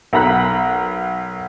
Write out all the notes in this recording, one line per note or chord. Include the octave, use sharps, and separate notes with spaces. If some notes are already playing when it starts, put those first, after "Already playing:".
B1 A#4 A#5 B5 F#6